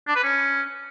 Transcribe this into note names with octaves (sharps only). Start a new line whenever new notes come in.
D4
B4
C#4